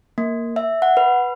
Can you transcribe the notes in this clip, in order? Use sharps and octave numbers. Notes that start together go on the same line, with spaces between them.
A#3
E5
F#5
B4